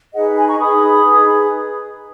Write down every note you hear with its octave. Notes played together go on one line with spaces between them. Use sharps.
D#4 G#4 B4 D#5 F#5
G#5 B5
A#5 C#6
D#4 G#4 B4 B5 D#6
D#4 G#4 B4